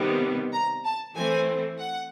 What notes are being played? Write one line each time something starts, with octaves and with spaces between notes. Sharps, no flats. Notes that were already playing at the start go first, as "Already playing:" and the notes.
Already playing: C3 D#3 G3 B3
A#5
A5
E3 A3 C4 G#5
F#5